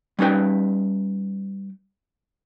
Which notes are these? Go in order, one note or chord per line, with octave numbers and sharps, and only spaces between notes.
G3 C#4 D#4 B4 G5